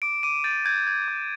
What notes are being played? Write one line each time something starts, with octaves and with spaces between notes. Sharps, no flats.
D6 D7
D6 D#7
G6 A6
G6 G#6
G6 G#6
D6